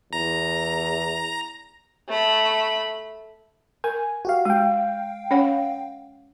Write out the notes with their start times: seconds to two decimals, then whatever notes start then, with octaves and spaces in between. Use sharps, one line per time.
0.13 E2 A#5
2.08 A3 B5
3.84 A#4 G#5
4.25 F#4 G4 F5
4.45 G#3 F5 G5
5.31 C#4 C#5 F#5